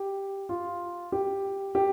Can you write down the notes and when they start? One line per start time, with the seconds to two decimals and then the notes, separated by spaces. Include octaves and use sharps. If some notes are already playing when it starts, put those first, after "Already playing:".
Already playing: G4
0.49 F4
1.12 G4
1.75 G4